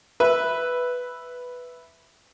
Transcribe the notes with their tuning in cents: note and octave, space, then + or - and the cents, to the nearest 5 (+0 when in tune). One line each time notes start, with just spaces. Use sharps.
B4 +0 E5 +0